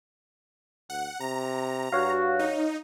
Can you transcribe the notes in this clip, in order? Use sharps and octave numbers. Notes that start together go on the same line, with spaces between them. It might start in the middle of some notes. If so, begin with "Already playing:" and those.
D2 F#5
C3 A#5
G2 F#4 C#5 F5
D#4